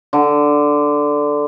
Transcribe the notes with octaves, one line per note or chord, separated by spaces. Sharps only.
D3